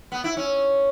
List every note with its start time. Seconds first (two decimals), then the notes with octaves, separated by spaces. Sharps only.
0.12 B3
0.24 E4
0.37 C#4